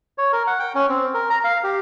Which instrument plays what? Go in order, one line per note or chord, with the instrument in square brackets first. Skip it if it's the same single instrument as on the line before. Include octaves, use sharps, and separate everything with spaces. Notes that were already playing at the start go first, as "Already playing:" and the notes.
[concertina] C#5
A#4
F#5
G5
C#4
C4
A#4
A#5
F5
G4